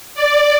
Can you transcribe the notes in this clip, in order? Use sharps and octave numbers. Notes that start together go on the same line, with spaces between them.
D5